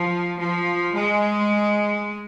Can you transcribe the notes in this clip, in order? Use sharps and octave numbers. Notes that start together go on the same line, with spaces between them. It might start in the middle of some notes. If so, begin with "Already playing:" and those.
Already playing: F3
F3
G#3